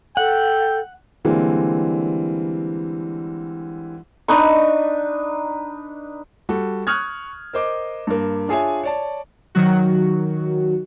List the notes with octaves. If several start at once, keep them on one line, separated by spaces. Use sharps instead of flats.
A4 F#5 G5
D3 E3 G3 G#3 A#3 C4
D4 D#4 B4 C#6
G3 F#4 A4
C#6 D#6 F6 F#6 G#6
A#4 C5 D#5 D6
G2 A#3
D4 F4 G#4 C#5 E5 G#5
C#5 D5 A5
D#3 F#3 F#4